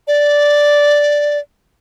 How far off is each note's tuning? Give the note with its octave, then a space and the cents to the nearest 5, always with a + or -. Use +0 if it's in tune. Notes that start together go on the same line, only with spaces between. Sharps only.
D5 -5